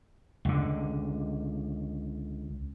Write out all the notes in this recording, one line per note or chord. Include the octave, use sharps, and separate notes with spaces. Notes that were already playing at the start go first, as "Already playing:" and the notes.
C#2 D3